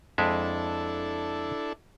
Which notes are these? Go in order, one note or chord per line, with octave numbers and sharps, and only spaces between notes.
F2 G#3 D4 E4 A4 E5